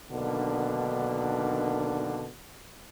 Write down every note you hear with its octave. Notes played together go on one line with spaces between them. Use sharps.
B1 B2 D3 D#3 A#3 D4